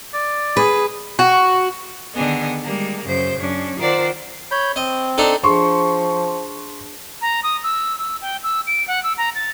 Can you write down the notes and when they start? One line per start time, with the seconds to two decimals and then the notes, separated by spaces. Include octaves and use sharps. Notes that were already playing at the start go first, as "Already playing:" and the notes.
0.14 D5
0.57 G#4 B4
1.19 F#4
2.15 D3 D#3 B3 G#4 D#5
2.64 G3 G#3 A#3
3.05 F#2 C#3 C5 G6
3.38 F#2 C#4 D4
3.77 D#3 F4 A#4 C5 D5 F#5
4.51 C#5 B5 G6
4.76 C4 D#5
5.18 D4 D#4 A4
5.44 F3 D4 G#4 C6 C#6
7.22 A#5
7.43 D#6
7.64 E6
7.99 E6
8.22 G5
8.43 E6
8.67 D7
8.88 F#5
9.04 E6
9.18 A#5
9.35 A6